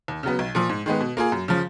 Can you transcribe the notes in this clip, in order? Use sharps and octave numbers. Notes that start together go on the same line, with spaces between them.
D#2
C#3 F#3 B3
B1
A#2 F3
G#2
D#3 G#3 B3
B2
A#3 F4 G#4
F#2
C#3 F3